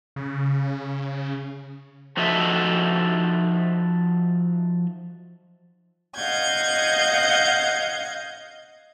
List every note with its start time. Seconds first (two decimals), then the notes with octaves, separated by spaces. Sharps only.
0.16 C#3
2.17 F3 D#4 F#4 A4 D#5 E5
6.17 D#5 F5 F#5 G6 G#6